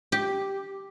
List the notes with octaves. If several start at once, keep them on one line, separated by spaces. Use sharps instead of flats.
G4